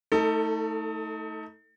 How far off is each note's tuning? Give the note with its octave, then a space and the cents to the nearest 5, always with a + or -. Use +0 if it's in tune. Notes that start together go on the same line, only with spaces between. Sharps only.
A3 +0 D#4 +35 A4 +30